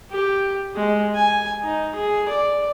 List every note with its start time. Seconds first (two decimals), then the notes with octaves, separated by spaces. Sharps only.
0.11 G4
0.76 G#3
1.15 G#5
1.63 D#4
1.95 G#4
2.29 D5